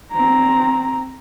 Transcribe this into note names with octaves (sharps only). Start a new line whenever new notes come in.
C4 A#5